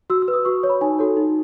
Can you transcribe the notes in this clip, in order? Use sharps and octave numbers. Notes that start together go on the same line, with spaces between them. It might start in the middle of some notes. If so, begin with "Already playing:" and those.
F#4 E6
E6
B4
D#6
F#4 C#6
C#5
B5
D#4 G#5
F#4 A4 C#5
D#4